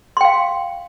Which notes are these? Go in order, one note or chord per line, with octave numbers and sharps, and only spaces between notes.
F5 G5 C6